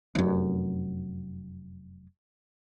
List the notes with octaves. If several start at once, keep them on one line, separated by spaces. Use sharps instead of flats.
F1 F#2